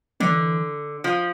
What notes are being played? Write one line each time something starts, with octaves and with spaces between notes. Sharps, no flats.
D3 E3
F3